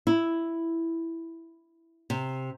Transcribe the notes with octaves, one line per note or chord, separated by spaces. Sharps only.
E4
C3